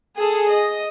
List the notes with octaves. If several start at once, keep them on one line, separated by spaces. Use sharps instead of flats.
G#4 A4
D#5